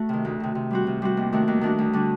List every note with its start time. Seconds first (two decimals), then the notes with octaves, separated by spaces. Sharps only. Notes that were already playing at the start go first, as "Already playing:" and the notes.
Already playing: A3 F#4
0.09 C3 D#3
0.25 D2
0.40 C3 D#3
0.55 C3
0.71 G3 C4 F#4
0.87 C3
1.02 G3 C4 F#4
1.17 D#2
1.32 D#3 A3 D4 F#4
1.48 D#2
1.61 D#3 A3 D4 F#4
1.79 D2
1.93 D3 G3 D4 F#4